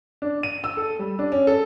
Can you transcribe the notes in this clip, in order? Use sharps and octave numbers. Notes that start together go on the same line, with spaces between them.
D4
D#7
E6
A4
G3
D4
C#4
A4